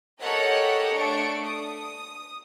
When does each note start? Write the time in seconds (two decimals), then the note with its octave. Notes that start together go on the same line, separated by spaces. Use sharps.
0.20 G4 A4 A#4 C#5 D#5 F#5
0.95 A3 D4 C#6 D7
1.43 D#6